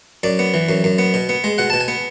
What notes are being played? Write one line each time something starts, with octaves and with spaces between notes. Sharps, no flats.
F#2 D5
B3
E3
F#2
F#2
B3
B2
B3
G#3
B2 F#5
B2 A5
G#5
B3